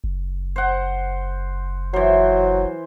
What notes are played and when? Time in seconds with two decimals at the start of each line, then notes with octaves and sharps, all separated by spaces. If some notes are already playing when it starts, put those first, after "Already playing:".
0.04 F#1
0.56 C5 F#5
1.94 E3 F#3 C5